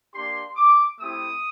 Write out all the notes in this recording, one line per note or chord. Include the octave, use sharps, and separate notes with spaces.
A#3 D4 G4 C6
D6
A3 C4 E4 G4 D#6